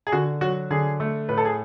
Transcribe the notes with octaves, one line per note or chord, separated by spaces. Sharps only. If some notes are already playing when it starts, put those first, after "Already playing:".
G#4
D3 F#4
F#3 F#4
D3 G#4
A3
A2 B4
A4
G#4